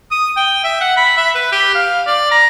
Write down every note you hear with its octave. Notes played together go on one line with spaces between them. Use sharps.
D#6
G5
E5
F#5
B5
E5
B4
G4
F5
D5
A#5